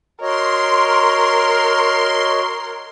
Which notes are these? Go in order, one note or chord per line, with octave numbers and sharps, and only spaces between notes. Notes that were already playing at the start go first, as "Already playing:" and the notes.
F#4 A#4 C#5 D#5 C6